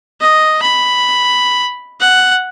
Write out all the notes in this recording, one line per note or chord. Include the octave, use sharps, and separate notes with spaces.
D#5
B5
F#5